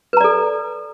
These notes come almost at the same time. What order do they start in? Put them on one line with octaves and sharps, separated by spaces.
B4 A#5 D5 A4